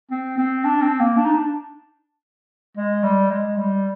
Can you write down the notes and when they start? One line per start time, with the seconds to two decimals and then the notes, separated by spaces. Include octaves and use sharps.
0.11 C4
0.38 C4
0.65 D4
0.82 C4
1.00 A#3
1.17 D4
1.25 D#4
1.34 D4
2.77 G#3
3.04 G3
3.30 G#3
3.58 G3